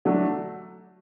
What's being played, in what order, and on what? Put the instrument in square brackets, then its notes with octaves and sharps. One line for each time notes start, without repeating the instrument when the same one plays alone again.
[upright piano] D3 F#3 A3 D4